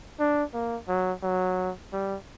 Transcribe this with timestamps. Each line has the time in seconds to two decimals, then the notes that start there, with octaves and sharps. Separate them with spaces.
0.19 D4
0.54 A#3
0.88 F#3
1.23 F#3
1.93 G3